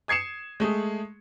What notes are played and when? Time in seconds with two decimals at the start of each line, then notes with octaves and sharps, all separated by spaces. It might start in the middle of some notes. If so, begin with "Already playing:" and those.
0.08 D#6 G#6 C7 C#7 E7
0.60 G#3 A3 G#4